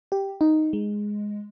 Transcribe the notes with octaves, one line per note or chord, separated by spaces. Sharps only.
G4
D#4
G#3